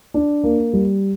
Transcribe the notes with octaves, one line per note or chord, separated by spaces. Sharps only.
D4
A#3
G3